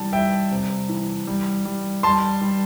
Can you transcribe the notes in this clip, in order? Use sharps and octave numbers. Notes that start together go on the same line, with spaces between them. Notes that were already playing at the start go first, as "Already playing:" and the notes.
Already playing: C3 E3 G3 A5
G3 E5 G5
C3
E3
G3
G3
G3 A5 C6
G3